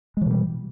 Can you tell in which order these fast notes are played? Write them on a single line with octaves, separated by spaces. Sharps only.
G#3 E3 B2 G3